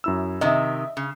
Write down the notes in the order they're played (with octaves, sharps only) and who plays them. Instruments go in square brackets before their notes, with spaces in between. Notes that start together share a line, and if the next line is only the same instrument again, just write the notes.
[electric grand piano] F#2 E4 E6
[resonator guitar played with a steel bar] C3 D#3 [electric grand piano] D#5 E5
[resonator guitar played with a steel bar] C#3